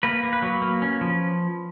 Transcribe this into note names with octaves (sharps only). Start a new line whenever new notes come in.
A#3 B4
A#3
B4
F#3
A#3
C#4
F3